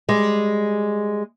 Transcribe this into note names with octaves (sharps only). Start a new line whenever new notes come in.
G3 G#3